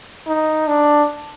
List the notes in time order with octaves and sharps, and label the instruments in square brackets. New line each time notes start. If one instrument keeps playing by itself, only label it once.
[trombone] D#4
D4